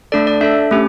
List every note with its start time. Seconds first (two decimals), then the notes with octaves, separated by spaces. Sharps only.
0.12 A3 D4 A4 D5
0.27 D5
0.41 D4 A4 E5
0.71 A3 C#4 G4